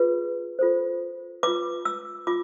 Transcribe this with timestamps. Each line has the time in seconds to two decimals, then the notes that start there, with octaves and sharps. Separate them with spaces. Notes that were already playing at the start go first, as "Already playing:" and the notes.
Already playing: F4 G#4 B4
0.59 F4 A4 C5
1.43 F4 B4 D6
1.85 E6
2.27 F4 D6